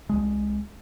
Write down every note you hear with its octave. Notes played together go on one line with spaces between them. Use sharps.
C2 G#3